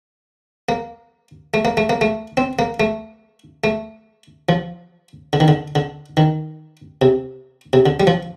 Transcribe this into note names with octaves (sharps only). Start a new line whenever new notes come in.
A#3
A3
A#3
A3
A#3
A3
C4
A#3
A3
A3
F3
D3
D#3
D3
D3
D#3
C3
C3
D3
G3
F3